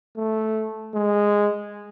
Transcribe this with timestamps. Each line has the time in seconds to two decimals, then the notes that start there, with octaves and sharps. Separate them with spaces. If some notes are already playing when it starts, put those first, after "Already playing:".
0.17 A3
0.94 G#3